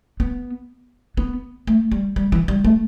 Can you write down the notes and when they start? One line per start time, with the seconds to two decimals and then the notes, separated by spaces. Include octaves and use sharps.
0.20 B3
1.17 B3
1.67 A3
1.92 G3
2.16 G3
2.32 E3
2.48 G3
2.64 A3